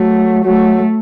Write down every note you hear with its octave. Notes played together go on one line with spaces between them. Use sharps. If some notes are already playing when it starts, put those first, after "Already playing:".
Already playing: F#3 A3
F#3 A3